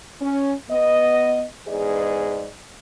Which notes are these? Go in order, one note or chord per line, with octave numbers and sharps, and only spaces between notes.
C#4
B3 D#5
E2 G#2 G#4 B4 D5 D#5